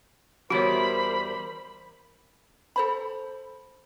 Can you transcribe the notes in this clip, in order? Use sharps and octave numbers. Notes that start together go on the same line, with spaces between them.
E2 G3 F#4 A#4 C5 C#5 B5
A4 C5 B5